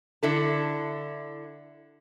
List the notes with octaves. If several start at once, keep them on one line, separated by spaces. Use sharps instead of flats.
D3 E4 A4